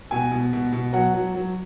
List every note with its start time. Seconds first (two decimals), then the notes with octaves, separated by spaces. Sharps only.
0.11 B2 G#5
0.31 B2
0.53 B2
0.73 B2
0.93 F#3 F#5
1.14 F#3
1.34 F#3